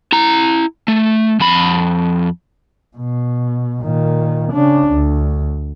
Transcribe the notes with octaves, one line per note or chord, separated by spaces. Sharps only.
E4 A#5
A3
F2 B5
B2
A#2 D#3
C#3 D4
D2